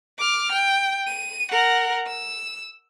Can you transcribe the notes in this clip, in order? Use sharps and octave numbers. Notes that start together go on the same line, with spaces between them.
D6 F6
G5
D#7
A#4 F#5
E6